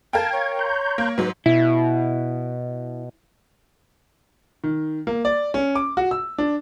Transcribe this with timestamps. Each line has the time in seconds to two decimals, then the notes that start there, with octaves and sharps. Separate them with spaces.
0.13 A#4 F5 G5 A5 G#6
0.33 C#5
0.59 A#5 C6 G6
0.98 A#3
1.18 G#2 F#3 B4
1.46 B2 E4
4.64 D#3
5.07 A#3
5.25 D5
5.54 C#4
5.75 D6
5.97 F#4
6.11 E6
6.38 D4